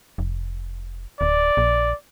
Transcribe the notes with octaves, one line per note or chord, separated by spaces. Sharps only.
F1
D1 D5
A#1